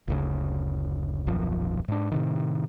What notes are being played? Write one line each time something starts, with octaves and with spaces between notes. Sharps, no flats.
F#1 D2 C#3
D#1 B1 F#2 F3
G#2 D4
A2 C3 D#3